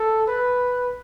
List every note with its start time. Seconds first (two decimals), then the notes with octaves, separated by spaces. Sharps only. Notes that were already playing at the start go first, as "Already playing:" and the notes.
Already playing: A4
0.27 B4